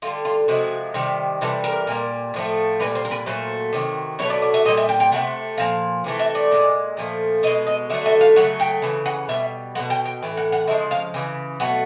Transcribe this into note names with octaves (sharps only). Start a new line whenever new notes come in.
D3 G3 F4
F4
C3 F3 G#3 F#4
C3 D#3 G3
C3 E3 G3 A4
A#4
A#2 G3
A2 F3 A3
A#2 G3 B4
C5
A#4
B4
A#2 F#3 A3 C5
C3 D#3 F#3
B2 F#3 A3 C#5
D5
D5
E5
A#2 G3 D#5
E5
G5
G5
C3 F3 A3 F#5
A#2 F3 F5
C3 E3 A3
E5
D5
A#2 F3 G#3
A#2 F3 A3
B2 G#3 D#5
D#5
D3 F#3 A3 E5
E5
F5
C#3 F#3 A3 F#5
G5
C#3 E3
F#5
B2 G3 E5
G#3 F#5
B2
G5
G5
A2 E3
F#5
F#5
C#3 F3 G#3 E5
F5
C#3 E3
B2 F#3 A3 F#5